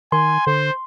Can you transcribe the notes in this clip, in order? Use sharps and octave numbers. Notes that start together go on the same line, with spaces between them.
D#3 G#5 C6
D3 C5